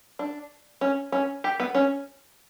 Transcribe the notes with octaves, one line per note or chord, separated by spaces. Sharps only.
D4
C#4
C#4
G4
B3
C#4